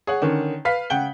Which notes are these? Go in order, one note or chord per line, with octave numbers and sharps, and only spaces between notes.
G#4 C#5 F#5
D3 D#3 C#4
B4 F5 B6
C#3 F#5 G5 G7